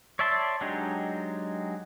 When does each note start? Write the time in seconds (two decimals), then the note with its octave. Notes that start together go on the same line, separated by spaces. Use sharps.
0.19 C#5 D5 E5 A5 C6
0.61 F#3 G#3 D4 D#4 G4